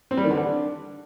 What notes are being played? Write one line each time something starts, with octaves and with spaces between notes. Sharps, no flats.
C4
G3
D#3
D3
D4